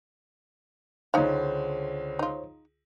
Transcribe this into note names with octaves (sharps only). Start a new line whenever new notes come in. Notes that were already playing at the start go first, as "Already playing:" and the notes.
C#2 D3 F#3 D#4 C5 C#5 F5
D#4 F4